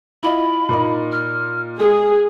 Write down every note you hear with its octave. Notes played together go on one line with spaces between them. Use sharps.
E4 F4 D#5 B5
A#2 A#3 D#4
F6
G#3 G#4 D#6